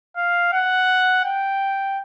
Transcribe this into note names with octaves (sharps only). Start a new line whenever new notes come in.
F5
F#5
G5